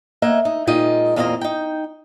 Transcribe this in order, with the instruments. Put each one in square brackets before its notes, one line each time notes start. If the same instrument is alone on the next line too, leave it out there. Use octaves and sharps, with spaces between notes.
[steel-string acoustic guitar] A#3 D#5 E5 F#5
D#4
A#2 G#3 D#4 F4 D#5 G5
E2 A#2 A#3 C4 D#5 A#5
D#4 G5